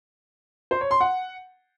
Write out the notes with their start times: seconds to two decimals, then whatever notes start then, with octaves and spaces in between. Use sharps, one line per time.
0.71 C5
0.81 C#5
0.91 C6
1.01 F#5